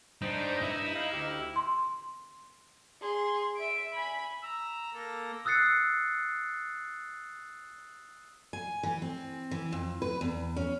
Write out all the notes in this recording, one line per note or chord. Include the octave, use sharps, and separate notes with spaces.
G3 D4 D#4 C5
G2 E4 E5 D#6
D#5 F5 B5
D2 G4 F6
C6
G#4 C6
E5 D7
G#5 B5
A#5 E6
A#3 A4 A#6
D#6 E6 F#6 A6 C7 C#7
G#5
E3
C4
E3
F2
B4
E2
C#4